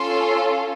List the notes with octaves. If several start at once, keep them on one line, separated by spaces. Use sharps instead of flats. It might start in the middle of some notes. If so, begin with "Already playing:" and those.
Already playing: C#4 F4 A4 C6